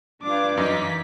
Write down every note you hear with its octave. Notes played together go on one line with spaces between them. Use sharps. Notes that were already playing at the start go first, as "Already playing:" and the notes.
G2 D4 F4 D6
F#2 E3 D#4 D#5 B6